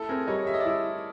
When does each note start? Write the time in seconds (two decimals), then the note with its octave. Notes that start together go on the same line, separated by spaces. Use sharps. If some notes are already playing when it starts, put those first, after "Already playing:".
Already playing: A3 E4 A4
0.09 C4 G#4 A#4
0.27 G3 C#5 D#5
0.46 G3 E5
0.54 D#5
0.60 D5
0.65 E4